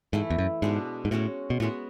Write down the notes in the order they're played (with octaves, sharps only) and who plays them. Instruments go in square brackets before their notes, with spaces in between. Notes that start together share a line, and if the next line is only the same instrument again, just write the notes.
[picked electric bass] G#2 [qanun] E3 A3 E4
[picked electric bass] E2
F#2
[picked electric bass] G#2 [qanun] B2 G#3 D4
[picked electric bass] G#2
[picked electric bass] A2 [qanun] G#3 C#4 F#4 C#5
[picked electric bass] B2
[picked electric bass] A2 [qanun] G#3 B3 F#4